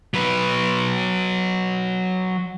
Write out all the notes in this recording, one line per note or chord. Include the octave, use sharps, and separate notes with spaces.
F#3 B4